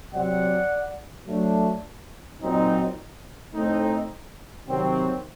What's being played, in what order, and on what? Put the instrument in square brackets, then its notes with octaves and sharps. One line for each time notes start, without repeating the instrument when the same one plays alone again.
[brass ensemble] C3 F#3 C4 D5 F#5
F#3 A3 D4
A#2 F#3 C4 D#4
A2 A3 C4 D#4
C3 D#3 F#3 C4